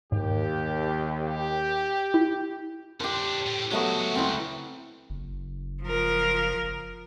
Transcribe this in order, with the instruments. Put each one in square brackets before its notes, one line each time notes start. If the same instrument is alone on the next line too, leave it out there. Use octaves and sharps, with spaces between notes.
[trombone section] D#2 [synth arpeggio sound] G#2 [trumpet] G4
[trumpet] G4
[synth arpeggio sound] E4
[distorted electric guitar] F2 D4 [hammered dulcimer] G4 C5
[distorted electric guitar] A2
[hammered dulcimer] F#3 A3 B3 [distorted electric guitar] G#3 F#4
[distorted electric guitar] C#2 [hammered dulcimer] C4 E4
[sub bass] F#1
[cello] F3 A#4